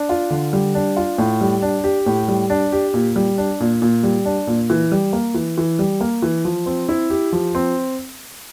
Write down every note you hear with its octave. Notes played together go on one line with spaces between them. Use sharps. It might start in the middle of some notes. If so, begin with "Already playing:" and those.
Already playing: D4
F4
D3
G3
D4
F4
A2
G3
D4
G4
A2
G3
D4
G4
A#2
G3
D4
A#2
A#2
G3
D4
A#2
E3
G3
A#3
E3
E3
G3
A#3
E3
F3
C4
E4
G4
F3
C4